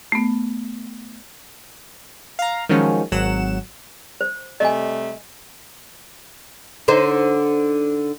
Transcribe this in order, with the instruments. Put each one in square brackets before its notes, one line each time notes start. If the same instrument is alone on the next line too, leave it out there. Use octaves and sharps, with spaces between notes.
[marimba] A3 B3
[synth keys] F5 A#5
D#3 F3 F#3 G#3 C#4
G#1 F#3 F#5 E7
[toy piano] C5
[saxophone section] C3 G3 A3 [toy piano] D#5 G#5
[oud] D3 D#4 C5